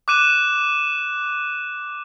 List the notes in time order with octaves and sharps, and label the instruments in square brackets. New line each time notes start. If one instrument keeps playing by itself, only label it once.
[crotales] D6 F#6 D#7 E7